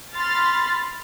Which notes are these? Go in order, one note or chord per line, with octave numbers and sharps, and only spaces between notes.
B5 C6 F6 A6